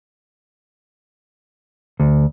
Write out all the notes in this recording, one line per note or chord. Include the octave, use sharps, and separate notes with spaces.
D2